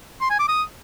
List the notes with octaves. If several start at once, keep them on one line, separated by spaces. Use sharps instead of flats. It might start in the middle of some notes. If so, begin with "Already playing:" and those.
C6
G#5
D6
D#6